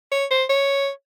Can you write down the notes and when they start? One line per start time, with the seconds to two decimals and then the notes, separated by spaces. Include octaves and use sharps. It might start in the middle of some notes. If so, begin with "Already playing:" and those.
0.12 C#5
0.31 C5
0.50 C#5